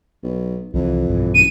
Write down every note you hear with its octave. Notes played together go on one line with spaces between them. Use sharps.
B1
C2 F2 E3
B1 G2 E3
F#1 D#7